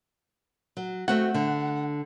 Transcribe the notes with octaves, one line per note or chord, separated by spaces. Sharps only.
F#3
A3 C4 F#4 F#5
D3